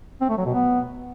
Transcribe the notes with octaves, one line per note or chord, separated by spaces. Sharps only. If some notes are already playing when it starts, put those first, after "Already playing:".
C4
A3
F#3
B2
B3